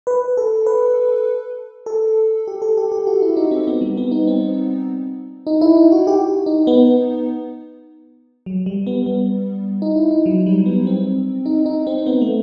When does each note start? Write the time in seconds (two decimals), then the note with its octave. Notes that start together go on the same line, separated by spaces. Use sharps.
0.07 B4
0.37 A4
0.66 B4
1.86 A4
2.48 G4
2.62 A4
2.77 G4
2.92 G4
3.07 F#4
3.22 E4
3.37 D#4
3.51 C4
3.67 B3
3.81 G3
3.97 B3
4.11 D#4
4.27 C4
5.47 D#4
5.61 E4
5.77 D#4
5.92 F#4
6.07 G4
6.46 D#4
6.67 B3
8.46 F#3
8.66 G3
8.87 B3
9.06 B3
9.82 D#4
9.96 E4
10.11 D#4
10.26 F#3
10.46 G3
10.66 B3
10.87 C4
11.46 D#4
11.66 D#4
11.87 C4
12.06 B3
12.21 A3